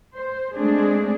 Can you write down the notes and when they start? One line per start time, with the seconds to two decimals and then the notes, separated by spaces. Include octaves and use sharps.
0.16 C5
0.56 G#3 A3 C4 D4 G#4